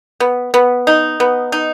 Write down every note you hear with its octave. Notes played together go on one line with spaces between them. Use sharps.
B3
B3
D#4
B3
D#4